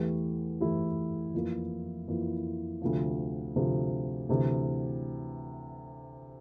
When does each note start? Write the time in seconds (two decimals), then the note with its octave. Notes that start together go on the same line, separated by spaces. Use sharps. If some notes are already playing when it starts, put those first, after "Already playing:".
Already playing: E2 E3 A3 E4 G4
0.60 E2 E3 A3 E4 G4
1.34 F2 E3 A#3 E4
2.08 F2 E3 A#3 E4
2.82 D2 C3 F3
3.56 D2 C3 F3
4.29 D2 C3 E3